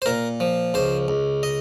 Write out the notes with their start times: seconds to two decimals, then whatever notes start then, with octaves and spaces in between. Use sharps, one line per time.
0.02 C5
0.06 A#2 A#4
0.40 F3
0.74 C#2 C5
1.08 C#2
1.43 D#5